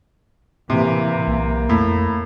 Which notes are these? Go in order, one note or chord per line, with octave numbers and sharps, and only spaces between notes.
A2 C3 E3 A#3
B1 A#3
F2 A2